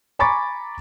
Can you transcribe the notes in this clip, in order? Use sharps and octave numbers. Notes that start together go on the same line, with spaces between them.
G#5 A#5 B5 C#6 D6 A6